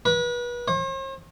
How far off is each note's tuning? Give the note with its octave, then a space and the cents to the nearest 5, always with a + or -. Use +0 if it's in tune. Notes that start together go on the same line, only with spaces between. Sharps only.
B4 -35
C5 +45